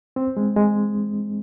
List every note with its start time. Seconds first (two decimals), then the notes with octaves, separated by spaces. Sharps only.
0.16 C4
0.37 G#3
0.56 G#3